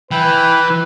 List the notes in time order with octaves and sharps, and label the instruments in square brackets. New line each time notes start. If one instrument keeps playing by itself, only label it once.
[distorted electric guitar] E3 [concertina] E4 G5 [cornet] B4